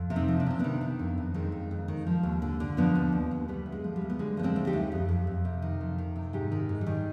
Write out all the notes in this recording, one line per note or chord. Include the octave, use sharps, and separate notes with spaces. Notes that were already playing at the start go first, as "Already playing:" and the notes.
Already playing: F2
C3
C4 D#4
F3
D4
C3 C4
D#3 B3 D4
D#3
F2
F2
D#3 G#3 C4
F2
F2
D#3
F3
D#2
D3
D3
F3 B3 D4
D#2
D#2
D#2
D2 G3 B3
D2
G#3
F3
G3
D2
B3
D3 G#3
F3 B3
G#3 C4
D2
D#4 G4
D2
F2
F2
F2
C3
D#3
F2
D#3
C3
G#2 D#4 G4
D#3
G#2
G3
D#3